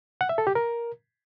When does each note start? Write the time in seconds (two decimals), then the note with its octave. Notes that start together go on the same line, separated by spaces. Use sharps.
0.21 F#5
0.29 E5
0.38 A4
0.47 G4
0.55 A#4